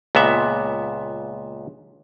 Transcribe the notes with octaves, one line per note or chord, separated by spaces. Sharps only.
C#2 A#2 B3 E5